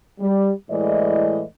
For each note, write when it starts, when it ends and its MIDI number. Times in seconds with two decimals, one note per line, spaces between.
0.20 0.49 55
0.69 1.42 45
0.69 1.42 52
0.69 1.42 56
0.69 1.42 64
0.69 1.42 74
0.69 1.42 75